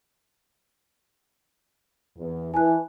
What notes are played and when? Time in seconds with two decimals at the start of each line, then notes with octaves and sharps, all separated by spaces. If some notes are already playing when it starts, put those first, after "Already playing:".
2.17 E2
2.54 E3 G#5 A5 F#6